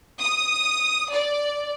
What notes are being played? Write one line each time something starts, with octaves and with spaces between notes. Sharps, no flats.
D#6
D5